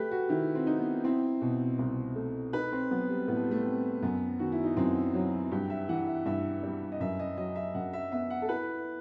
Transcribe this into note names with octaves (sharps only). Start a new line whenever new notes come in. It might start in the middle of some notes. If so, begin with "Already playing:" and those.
Already playing: A3 G4 B4
F#4
D#3 E4
C4
D#4
B3
C4 E4
B2
C2 C4
A3
D#4 B4
C4
F#3 B3
G3
A2 B3
A3
G3
A3
C4
F#2 B3
D#3 F#4
E4
D#4
F#2 C4
F#3
G2 G4
E5
E3 F#5
E5
G2 E5
G3
D#5
F#2 E5
D#5
F#3 D#5
E5
F#2 F#5
E5
B3 E5
F#5
A4
E4 B4